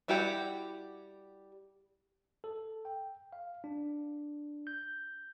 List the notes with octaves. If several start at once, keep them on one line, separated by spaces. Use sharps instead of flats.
G3 E4 F#4 G4 F#5
A4
G5
F5
D4
G6